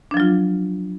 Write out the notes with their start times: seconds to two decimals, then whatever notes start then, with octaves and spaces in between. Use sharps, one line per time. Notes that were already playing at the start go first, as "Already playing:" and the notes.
0.11 D4
0.14 F3
0.17 F#3
0.20 F4